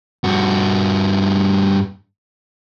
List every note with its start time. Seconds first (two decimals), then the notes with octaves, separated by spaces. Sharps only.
0.24 G2 F#4